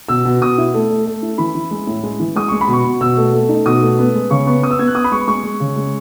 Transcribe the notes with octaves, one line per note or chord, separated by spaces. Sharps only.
B2 E6
B2
B2 D#6
E4
A3
A3
A3
E4
E3 B5
E3
G#3
A2
G#3
E3
G#3 D#6
G#3 C#6
B5
B2
C#6
B2
B2 E6
A3
A3
D#4
B2 D#6
A3
B3
G#3
C#3 C#6
B3 C#6
B3 D#6
E6
B3 G#6
F#6
B3 D#6
B5
G#3 C#6
G#3 C#6
G#3
C#3
G#3